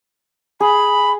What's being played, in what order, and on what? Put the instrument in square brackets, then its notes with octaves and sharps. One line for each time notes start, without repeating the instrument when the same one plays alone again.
[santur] G#4 [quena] B5